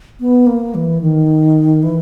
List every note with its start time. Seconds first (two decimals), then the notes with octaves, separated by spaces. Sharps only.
0.20 B3
0.47 A#3
0.75 E3
1.01 D#3
1.83 E3